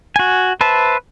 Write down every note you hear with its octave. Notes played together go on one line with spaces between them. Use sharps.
F#4 G#5
B4 C5 E5 A5